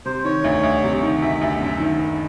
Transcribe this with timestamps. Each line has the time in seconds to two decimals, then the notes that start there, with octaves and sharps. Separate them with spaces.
0.05 C3 C5
0.24 D#3 C#5
0.44 D2
0.63 D2
0.83 C3
1.03 D#3
1.22 D2 E5
1.41 D2
1.61 F#2
1.80 D#3
1.99 F#1